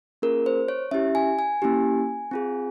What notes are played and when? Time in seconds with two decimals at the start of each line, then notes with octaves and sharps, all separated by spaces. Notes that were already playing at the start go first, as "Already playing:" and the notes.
0.22 A#3 C#4 F4 G#4 A#4
0.46 C5
0.68 C#5
0.91 C#4 E4 G4 E5
1.15 G#5
1.39 G#5
1.62 A#3 C#4 E4 G4
2.31 C4 F4 G#4